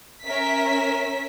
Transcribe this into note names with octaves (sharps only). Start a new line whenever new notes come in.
C#4 A#4 E5 B6